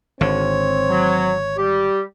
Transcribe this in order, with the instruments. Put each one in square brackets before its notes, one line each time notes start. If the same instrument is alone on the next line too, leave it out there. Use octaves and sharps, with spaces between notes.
[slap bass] G#1 D3 [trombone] C4 [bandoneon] C#5
[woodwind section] F#3
G3 G4